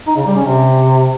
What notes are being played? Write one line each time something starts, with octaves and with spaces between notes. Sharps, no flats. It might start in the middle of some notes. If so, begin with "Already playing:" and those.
D#4
C#3
G3
C#4
C3